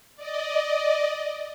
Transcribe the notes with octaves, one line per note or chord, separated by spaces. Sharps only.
D5 D#5